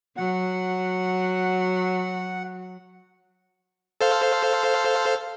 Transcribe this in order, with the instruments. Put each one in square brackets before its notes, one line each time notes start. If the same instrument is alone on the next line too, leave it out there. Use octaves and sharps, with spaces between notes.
[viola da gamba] F#3 [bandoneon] F#5
[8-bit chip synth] A4 C5 F5